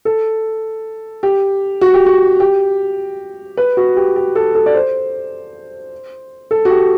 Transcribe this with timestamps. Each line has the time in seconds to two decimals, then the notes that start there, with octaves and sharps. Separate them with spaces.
0.05 A4
1.23 G4
1.81 F#4
1.94 G4
2.06 F#4
2.40 G4
3.57 B4
3.77 F#4
3.97 G4
4.16 G4
4.35 A4
4.55 A4
4.66 D5
4.75 C5
6.51 A4
6.65 F#4
6.70 G4